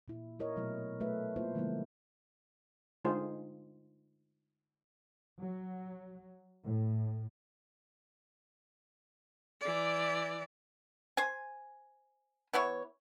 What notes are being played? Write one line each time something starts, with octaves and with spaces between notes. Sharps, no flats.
A#2 E4
E4 A#4 C#5 D#5
B2 F#3 A3 E4
F#3 A3 F#4 B4 E5
A#3 B3 E4 F4 B4 C5
D3 F3 G#3 A#3 B3 E4
D3 G#3 D#4 F4 G#4 C5
F#3
A2
E3 D5
C5 G#5
E3 B3 E4 C#5